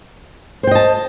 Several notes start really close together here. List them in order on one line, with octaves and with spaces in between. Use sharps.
C5 G5 D#5 A5